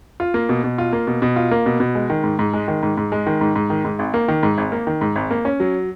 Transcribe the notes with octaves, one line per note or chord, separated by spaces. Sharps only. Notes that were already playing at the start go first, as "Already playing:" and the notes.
F4
A#3
B2
B2
F4
A#3
B2
B2
F4
A#3
B2
B2
G#3
D#3
G#2
G#2
G#3
D#3
G#2
G#2
G#3
D#3
G#2
G#2
D#3
G#2
G#1
A#3
D#3
G#2
G#1
A#3
D#3
G#2
G#1
A#3
C#4
F#3